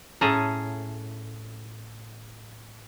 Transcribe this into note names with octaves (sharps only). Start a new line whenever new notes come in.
A2 C#4 G#4 A4 A#5